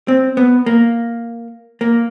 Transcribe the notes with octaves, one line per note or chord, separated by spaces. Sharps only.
C4
B3
A#3
A#3